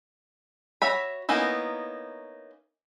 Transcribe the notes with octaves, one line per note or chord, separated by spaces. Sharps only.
F#4 C#5 E5 B5
A#3 B3 C#4 D#4 E4